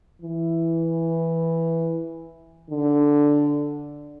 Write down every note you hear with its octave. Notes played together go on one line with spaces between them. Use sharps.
E3
D3